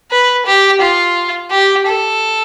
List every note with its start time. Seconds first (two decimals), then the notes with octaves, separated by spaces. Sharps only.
0.11 B4
0.46 G4
0.81 F4
1.51 G4
1.87 A4